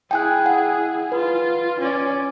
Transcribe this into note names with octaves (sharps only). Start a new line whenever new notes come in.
E4 G#4 G5 G#5 F#6
F#5
F4 B4
C#4 D5